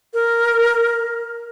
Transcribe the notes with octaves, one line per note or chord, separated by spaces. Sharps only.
A#4